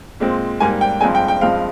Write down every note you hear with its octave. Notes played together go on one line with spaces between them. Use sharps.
A#2 G#3 C4
G#2 G3 A#3 G#5
G5
G2 F3 G#3 C4 G#5
G5
G5
G2 F3 G#3 C4 F5